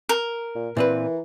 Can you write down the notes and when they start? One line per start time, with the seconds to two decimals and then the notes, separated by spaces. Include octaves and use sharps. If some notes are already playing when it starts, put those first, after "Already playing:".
0.09 A#4
0.55 A#2
0.77 A#2 E3 C4 B4